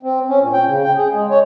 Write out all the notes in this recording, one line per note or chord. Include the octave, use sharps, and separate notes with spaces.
C4
C#4
A#2
G5
C#3
G5
G#4
G#3
C#5